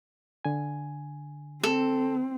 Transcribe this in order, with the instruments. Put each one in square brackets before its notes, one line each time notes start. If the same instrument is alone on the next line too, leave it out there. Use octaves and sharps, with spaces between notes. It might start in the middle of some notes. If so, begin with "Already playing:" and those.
[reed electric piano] D3 G#5
[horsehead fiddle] C4 [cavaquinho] A4